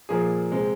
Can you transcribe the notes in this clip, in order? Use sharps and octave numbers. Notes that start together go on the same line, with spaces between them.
A#2 F3 A#3 G#4
C3 G#3 C4